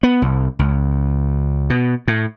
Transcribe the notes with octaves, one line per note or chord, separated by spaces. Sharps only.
B3
C2
C#2
B2
A2